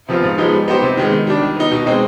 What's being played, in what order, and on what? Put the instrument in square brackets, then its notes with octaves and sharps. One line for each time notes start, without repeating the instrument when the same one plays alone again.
[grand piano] C3 F3 B3 F4
G#2
F3 G#3 B3 D#4
G3
B3 D#4 G4 C5
C3
D#3 G#3 B3
D#3
G3 D4
D#3
B3 D#4
B2
G#3 C4 D#4